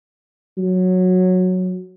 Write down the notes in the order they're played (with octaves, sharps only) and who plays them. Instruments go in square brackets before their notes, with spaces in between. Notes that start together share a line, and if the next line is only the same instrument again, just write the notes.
[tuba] F#3